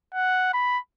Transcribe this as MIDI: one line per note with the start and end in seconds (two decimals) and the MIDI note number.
0.15 0.52 78
0.54 0.79 83